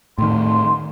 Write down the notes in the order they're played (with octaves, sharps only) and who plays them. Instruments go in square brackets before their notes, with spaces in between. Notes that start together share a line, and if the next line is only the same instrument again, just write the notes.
[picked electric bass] A2 D#3 [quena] C6